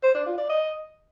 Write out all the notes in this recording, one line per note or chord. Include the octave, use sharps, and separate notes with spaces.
C5
D4
F4
D5
D#5